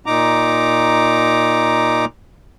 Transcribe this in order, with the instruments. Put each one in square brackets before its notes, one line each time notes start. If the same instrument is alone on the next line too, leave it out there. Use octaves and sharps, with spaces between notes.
[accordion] A#2 D#4 A#5 D6